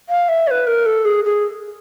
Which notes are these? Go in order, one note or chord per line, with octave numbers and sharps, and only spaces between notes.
F5
E5
C#5
B4
A#4
A4
G#4
G#4